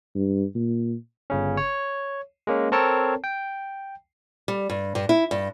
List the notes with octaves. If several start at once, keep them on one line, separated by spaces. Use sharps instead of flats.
G2
A#2
G1 C#3 C#4
C#5
G#3 A#3 C#4
C4 A4 A#4 C#5 A5
G5
G3
G2
G2
E4
G2